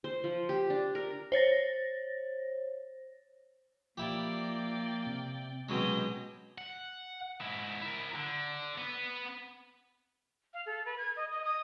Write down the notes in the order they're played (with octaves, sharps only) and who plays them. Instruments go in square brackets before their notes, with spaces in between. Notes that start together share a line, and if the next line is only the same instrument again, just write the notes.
[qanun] C5
F3
G4
D4
A#4
[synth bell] C5 C#5 A6 A#6
[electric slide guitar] F3 [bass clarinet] A#3 [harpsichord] E4 G4 [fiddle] D5 G5
[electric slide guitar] C3
[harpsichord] B2 F#3 G#3 [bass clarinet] C#4 [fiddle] G4 D#5
[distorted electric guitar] F#5
G#2 E4
E4 A#4
D3
B3 B4
[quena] F5
A4
B4
G#6
D#5
D#5
D#6